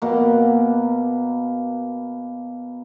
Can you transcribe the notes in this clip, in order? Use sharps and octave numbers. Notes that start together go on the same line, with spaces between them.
B2 A#3